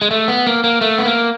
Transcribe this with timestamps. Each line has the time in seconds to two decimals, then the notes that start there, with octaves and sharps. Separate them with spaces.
0.02 G#3
0.11 A3
0.28 B3
0.47 A#3
0.64 A#3
0.81 A3
0.98 B3
1.05 A#3